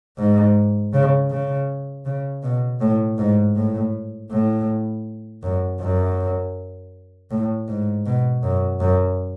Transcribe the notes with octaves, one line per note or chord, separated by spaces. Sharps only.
G#2
C#3
C#3
C#3
B2
A2
G#2
A2
A2
F#2
F#2
A2
G#2
B2
F#2
F#2